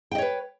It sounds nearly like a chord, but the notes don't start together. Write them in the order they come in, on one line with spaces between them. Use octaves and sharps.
G5 D#5 C#5 B4